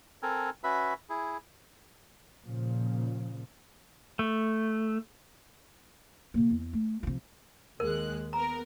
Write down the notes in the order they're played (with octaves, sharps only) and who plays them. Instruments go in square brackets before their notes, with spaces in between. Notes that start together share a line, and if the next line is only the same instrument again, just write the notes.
[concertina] C4 A4 A#4 G#5
C#4 F#4 B4 E5 B5
E4 G#4
[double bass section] A#2 C#3 F3
[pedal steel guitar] A3
[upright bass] C3 A#3
E2
A3
C3 F3
[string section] D#2 G#3 F#6 [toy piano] A#4
[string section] B3 A#4 [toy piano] A#5